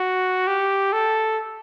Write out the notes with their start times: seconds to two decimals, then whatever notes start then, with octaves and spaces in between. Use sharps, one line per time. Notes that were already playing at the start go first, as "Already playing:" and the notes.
Already playing: F#4
0.47 G4
0.92 A4